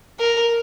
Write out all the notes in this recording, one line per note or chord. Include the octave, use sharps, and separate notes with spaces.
A#4